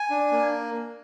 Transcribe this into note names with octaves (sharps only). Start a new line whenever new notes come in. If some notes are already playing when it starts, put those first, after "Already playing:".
Already playing: G#5
D4
A#3